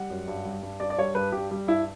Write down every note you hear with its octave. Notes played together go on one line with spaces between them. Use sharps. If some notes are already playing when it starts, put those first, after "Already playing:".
Already playing: G3 F#5
F#2
G2
G3
G2
G2 D5
D5
G3 C#5
G2 B4
G2 G4
G3
G2 E4